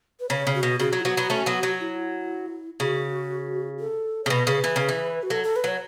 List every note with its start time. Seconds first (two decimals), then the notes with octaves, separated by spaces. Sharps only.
0.20 B4
0.29 C#3 C#5
0.47 C#3
0.55 F#4
0.63 B2
0.80 C#3 F#4
0.93 F#3
1.00 E4
1.04 F#3 B3 F#4
1.17 F#3 B3
1.30 A3 C#4
1.46 F#3 B3
1.63 F#3
1.80 E4
2.79 C#3 F#4
3.80 A4
4.24 C#3 C#5
4.30 B2 B4
4.47 C#3
4.55 B4
4.64 E3
4.76 C#3
4.89 E3
5.23 F#4
5.30 F#3 A4
5.43 A4
5.56 B4
5.64 F#3 C#5